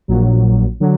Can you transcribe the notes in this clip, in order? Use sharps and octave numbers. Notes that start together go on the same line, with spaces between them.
A#1 A#2 F#3
D3 F#3